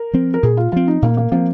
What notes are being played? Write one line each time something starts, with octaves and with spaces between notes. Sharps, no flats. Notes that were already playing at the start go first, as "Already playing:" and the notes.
Already playing: A#4
F3 C4
A#4
A#2 G#4
F4
F3 C4 F4
D#4
A#2 A#3
A#3
F3 A#3 C4